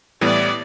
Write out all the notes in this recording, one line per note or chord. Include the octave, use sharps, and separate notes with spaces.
A2 E3 G3 B3 D5